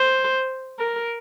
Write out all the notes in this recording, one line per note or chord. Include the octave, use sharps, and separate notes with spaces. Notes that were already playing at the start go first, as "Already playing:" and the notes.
Already playing: C5
A#4